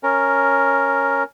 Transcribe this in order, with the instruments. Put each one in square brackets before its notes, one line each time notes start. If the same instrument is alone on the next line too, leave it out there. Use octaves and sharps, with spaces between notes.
[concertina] C#4 A#4